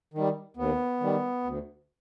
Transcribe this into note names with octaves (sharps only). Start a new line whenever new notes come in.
D#3 G3
D#2 B3
D#3 G3
D2